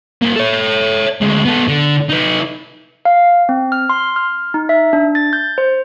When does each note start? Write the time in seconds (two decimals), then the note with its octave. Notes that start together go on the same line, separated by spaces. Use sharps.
0.22 A#3 F#4
0.36 A4 C#5
1.21 D2 G#3
1.46 B3 A4
1.69 D3
2.10 D#4 B4
3.05 F5
3.49 C4
3.72 F6
3.89 C6
4.16 F6
4.54 D#4
4.69 E5
4.93 D4
5.15 A6
5.33 G6
5.58 C5